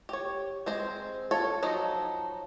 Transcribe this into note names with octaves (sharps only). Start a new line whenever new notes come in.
G4 C#5
G#3 C4 C5
F4 A4 C#5
F3 F#3 D#4